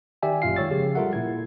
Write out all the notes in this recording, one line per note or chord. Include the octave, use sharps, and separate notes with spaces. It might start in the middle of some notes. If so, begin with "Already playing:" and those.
D#3 G4 D5 E5 G5 G#5
G1 F#2 A#2 F4 F5 C7
D#3 G#3 C#5 E6 A6
C#3 F3 G4 G#4
G3 F4 A4 A#4 E5 F#5
A#2 E4 G#6